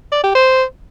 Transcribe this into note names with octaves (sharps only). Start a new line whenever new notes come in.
D5
G4
C5